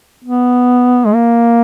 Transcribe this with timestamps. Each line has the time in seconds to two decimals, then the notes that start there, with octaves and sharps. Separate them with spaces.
0.25 B3
1.05 G#3
1.14 A#3